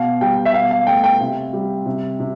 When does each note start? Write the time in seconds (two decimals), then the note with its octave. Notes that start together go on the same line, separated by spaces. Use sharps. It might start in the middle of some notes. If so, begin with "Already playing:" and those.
Already playing: B2 F5
0.21 G3 G5
0.45 E5
0.54 B2 F5
0.71 F5
0.87 A3 G5
1.04 G5
1.20 C3
1.53 G3
1.86 C3
2.20 C3